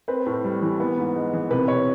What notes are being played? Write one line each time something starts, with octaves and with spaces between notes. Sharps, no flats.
C4 B4
A2
G3
E3
B3
G#2
G#3
E3
C3 B4
C3 C#5